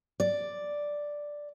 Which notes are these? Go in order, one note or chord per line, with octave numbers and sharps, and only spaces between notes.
D5